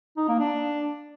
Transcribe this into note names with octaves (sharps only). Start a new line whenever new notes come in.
D#4
A#3
D4